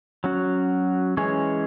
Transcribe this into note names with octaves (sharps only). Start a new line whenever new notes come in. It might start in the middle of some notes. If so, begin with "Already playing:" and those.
F#3 C#4 F#4
E3 G#3 C#4 G#4 C#5